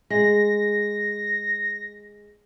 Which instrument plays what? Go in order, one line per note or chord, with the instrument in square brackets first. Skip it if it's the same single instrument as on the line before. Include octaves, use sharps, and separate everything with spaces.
[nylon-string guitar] G#3 [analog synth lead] A#6